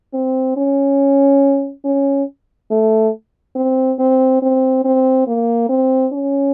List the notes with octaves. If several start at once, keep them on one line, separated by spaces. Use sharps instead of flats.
C4
C#4
C#4
A3
C4
C4
C4
C4
A#3
C4
C#4